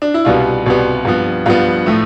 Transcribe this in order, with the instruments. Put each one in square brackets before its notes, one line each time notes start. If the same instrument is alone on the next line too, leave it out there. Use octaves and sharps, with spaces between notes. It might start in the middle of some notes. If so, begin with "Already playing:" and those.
[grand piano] D4
E4
C2 B2 G3 B3 F4
C2 B2 G3 B3
G2 F3 B3
G2 F3 B3 F4
A2 F3 A3